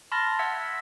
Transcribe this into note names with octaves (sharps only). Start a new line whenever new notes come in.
A5 B5 C6 F6 A6 A#6
E5 F#5 E6 G#6 B6